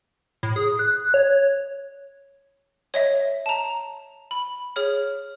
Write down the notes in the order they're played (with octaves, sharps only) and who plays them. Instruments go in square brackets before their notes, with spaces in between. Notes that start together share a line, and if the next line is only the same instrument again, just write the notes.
[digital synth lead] A2
G#4
F#6
C#5
[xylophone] C#5 D#5 E5
A5 A#5
B5
G#4 C#5 F6